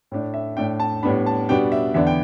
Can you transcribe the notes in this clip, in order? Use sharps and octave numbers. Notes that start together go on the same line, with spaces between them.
A2 A3 D4
E5
A2 A3 D4 G5
A5
A2 G3 B3 D4 B5
A5
B2 G3 B3 D4 G5
E5
E2 D3 B3 D4 E5
G5